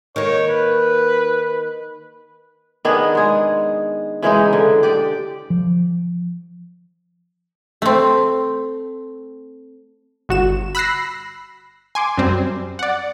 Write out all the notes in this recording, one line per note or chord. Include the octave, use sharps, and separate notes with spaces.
D#3 A#3 C#5
B4
D#3 B3 D4 G#4
G#3 G#4
C#3 E3 G#3 D#4
D3
G4 D5
F3
A3 C4
G1 F#4 E7
B5 E6 F#6 A#6 C7
G#5 C6 D6
F#2 G3 C4
D5 F#5